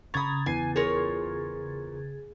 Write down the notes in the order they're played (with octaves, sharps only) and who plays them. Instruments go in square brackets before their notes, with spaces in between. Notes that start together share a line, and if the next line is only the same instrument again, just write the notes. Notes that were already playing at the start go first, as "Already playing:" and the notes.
[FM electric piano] C#3 G#6 A6 [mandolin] A#5 D#6 [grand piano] B5 C#6
[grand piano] E2 C7 [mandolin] G#5
[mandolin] F4 A#4 C#5 [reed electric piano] G#4